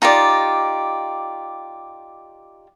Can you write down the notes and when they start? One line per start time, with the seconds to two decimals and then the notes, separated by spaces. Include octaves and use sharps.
0.02 D#4 F4 G4 D5